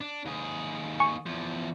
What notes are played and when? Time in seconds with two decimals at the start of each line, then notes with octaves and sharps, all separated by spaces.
0.01 D4
0.26 D#2 G#4
1.00 G#5 C#6 C#7
1.26 E2 F3